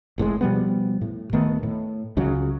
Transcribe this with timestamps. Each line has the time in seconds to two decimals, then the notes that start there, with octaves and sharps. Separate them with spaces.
0.18 F1 A2 D3 G#3
0.41 B2 F3 G3 B3
1.01 A2
1.33 D1 D#3 A3 B3
1.63 A2
2.17 C#2 C#3 F#3